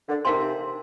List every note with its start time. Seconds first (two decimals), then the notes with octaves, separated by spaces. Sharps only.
0.08 D3
0.25 C3 D#4 A#4 F5 G#5 C6